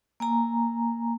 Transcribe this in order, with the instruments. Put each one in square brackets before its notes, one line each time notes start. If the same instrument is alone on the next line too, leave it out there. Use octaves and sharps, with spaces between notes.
[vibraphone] A#3 G#5 A#5